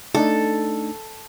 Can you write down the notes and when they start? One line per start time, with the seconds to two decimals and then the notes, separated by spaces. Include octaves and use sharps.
0.15 A3 D4 D#4 A4